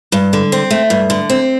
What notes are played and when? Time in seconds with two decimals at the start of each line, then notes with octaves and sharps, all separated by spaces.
0.12 G2
0.33 D3
0.52 C4
0.71 A3
0.90 G2
1.10 D3
1.30 C4